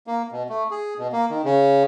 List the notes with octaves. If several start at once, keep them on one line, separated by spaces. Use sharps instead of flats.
A#3
B2
A3
G#4
B2
A#3
D#3
C#3